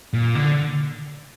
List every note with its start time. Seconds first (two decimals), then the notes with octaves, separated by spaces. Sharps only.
0.13 A#2
0.35 D3